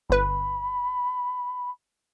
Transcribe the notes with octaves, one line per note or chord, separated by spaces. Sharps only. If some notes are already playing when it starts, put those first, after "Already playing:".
G1 B4 B5